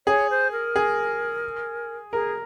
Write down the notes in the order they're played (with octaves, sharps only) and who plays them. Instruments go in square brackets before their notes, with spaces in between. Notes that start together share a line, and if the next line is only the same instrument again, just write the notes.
[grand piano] G#4 [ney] C#5
[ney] C5
A#4
[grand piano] G#4
[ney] G#4 [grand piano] A#4